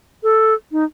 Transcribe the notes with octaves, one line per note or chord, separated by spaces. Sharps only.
A4
D#4